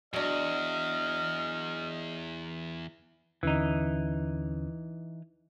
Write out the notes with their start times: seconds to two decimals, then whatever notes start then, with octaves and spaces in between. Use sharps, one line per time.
0.13 E2 F#3 D4 D#5 F6
3.43 D#2 D3 E3 C#4 D#4